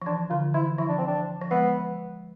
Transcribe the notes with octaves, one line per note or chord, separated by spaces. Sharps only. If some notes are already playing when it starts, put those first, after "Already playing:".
F3
E3 D4
D3 F4
E3 E4
F3 E4
D4
C4
D4
F3
G#3 B3